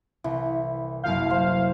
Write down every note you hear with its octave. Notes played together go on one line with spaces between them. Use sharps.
C2 E3
F#1 C2 F5 G6
C5